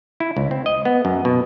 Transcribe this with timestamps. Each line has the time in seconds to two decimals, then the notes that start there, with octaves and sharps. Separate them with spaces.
0.20 E4
0.37 C#2
0.51 C4
0.66 D#5
0.85 B3
1.05 F#2
1.25 B2